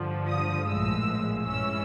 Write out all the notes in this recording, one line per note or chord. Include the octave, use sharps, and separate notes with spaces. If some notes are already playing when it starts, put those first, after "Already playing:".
Already playing: G2 D3 F3
D#6
A#1 A2 F3 G#3 E6
G2 E3 G#3 C#4 E6